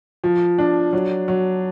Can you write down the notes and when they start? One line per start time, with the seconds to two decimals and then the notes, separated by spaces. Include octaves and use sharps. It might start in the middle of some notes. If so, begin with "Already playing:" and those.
0.24 F3
0.58 D4
0.93 F#3
1.28 F#3